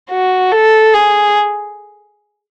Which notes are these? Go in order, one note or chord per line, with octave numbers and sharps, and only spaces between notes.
F#4
A4
G#4